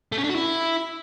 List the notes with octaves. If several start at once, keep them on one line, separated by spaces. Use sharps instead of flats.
A3
C#4
D4
F#4
E4